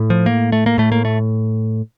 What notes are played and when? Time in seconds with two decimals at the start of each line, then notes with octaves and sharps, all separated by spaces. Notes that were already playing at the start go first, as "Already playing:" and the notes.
Already playing: A2
0.10 F3
0.26 A#3
0.52 A3
0.66 A#3
0.78 A2 A3
0.92 A#3
1.05 A3